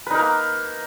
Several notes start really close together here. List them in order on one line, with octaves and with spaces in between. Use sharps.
B4 D#4 A#4 A#3